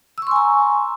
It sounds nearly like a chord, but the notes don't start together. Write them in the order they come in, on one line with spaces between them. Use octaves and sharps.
E6 C#6 C6 G#5 A#5